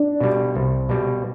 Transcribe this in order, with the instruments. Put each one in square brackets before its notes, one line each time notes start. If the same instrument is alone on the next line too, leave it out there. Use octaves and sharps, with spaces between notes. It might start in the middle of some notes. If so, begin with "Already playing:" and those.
Already playing: [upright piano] D4
[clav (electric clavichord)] B2 G3
C2
B2 G3